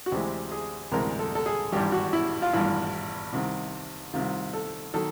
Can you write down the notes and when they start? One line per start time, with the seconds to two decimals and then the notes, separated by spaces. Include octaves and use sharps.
0.06 F#4
0.12 D2 C3 E3 G#3 C4 G4
0.52 G#4
0.92 D2 C3 E3 G#3 C4 A#4
1.19 A4
1.35 A4
1.46 G#4
1.72 G#1 G2 E3 G4
1.92 F#4
2.13 E4
2.42 F4
2.53 G#1 G2 E3 E4
3.32 C2 C3 D#3
4.13 C2 C3 D#3 F4
4.53 A4
4.94 D#3 F#3 A4